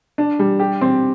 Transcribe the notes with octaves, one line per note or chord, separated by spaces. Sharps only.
D4
G3
G4
C4